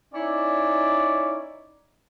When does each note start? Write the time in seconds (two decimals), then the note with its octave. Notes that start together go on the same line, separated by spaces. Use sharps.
0.13 C#4 D#4 E4 C#5 D5